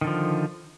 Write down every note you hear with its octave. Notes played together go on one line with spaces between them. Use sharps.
D3 D#3 F3